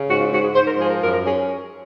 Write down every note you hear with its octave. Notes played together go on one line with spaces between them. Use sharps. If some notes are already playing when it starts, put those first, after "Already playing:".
Already playing: C#3
G#2 F#4
F4
G#2 F#4
G#4
G#2 C5
A#4
F3 G#4
A#4
F#2 A#4
A#4
C#4 G#4